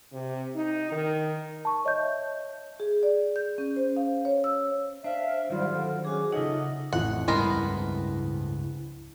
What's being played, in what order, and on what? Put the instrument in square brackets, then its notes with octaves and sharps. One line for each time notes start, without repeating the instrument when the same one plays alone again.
[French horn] C3
D#4
D#3
[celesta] A5 C#6
C#5 D#5 E5 G6
[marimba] G#4
D5
G6
C#4
C5
F5
C#5
E6
[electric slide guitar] D4 [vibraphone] C5 [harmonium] E5 [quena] F5
[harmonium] G#2 G3 [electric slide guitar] D#3 F#3 [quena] F4
[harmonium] D3
[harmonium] C#4 [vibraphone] F#4 G#4 [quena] D6
[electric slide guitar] C#3 E5 F#5 [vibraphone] D#4 F4 [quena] A4 [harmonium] D#5
[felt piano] A1 F2 E3 [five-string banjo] F#5
[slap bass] C#2 G2 G3 [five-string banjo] G#3 B3 A#4 [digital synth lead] E4